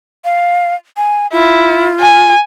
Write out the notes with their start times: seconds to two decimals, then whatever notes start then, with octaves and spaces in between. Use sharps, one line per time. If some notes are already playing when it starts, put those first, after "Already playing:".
0.25 F5
0.97 G#5
1.32 E4 F4
2.00 G#5